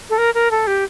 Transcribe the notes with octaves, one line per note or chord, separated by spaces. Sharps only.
A4
A#4
A#4
A4
G4